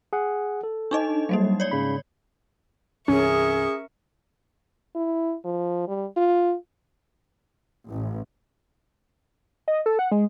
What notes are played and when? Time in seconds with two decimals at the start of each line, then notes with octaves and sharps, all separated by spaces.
0.13 G#4 F#5
0.63 A4
0.91 D4 D#4 D#5
1.29 F#3 G3 A#3
1.60 C#5 D5
1.71 G#2 C#3 B5
3.08 C2 G2 E3 C#4 G#4 A#4 E5 C#6
4.95 E4
5.45 F3
5.88 G3
6.17 F4
7.90 A1
9.68 D#5
9.86 A4
9.99 F#5
10.12 G#3